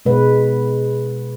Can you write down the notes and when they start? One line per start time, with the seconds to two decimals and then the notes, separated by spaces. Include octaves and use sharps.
0.06 B2 G#3 B4